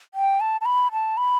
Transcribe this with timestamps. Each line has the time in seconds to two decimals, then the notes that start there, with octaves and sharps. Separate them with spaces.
0.14 G5
0.40 A5
0.61 A5
0.66 B5
0.92 A5
1.17 B5